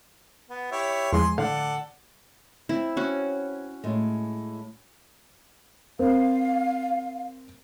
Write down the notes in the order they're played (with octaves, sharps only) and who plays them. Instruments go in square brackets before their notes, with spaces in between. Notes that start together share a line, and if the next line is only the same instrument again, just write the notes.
[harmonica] B3
E4 G4 C#5
[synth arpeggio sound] E2 F3 G#3 [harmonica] G#4 C6
[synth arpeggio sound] A2 D3 F5 [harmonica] A4 D5 F#5
[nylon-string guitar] C4 [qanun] E4
[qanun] C#4 F#4
[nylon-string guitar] A2 G#3
[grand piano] C4 A#4 [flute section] F5